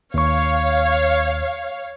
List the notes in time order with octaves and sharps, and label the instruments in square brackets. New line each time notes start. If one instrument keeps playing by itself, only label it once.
[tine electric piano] D#2 C#6 [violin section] C#5 F5